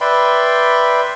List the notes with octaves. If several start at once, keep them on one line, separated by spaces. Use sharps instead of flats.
B4 D5 E5 G5 B5 C6